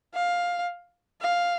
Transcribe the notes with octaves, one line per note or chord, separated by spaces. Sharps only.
F5
F5